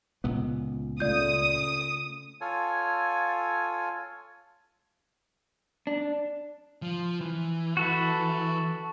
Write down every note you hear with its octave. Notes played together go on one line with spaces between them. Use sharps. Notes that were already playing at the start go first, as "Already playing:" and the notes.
C#2 A#2 B3
C#3 A3 F4 D5 D#6 G6
F4 A4 C#5 G#5
D4
F3
E3
F#4 A4 B4